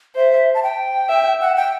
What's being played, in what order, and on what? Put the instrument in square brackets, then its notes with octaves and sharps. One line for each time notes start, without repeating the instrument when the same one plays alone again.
[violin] C5 [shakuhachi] E5
[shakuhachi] E5
A5
G5
[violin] E5
[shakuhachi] F#5
G5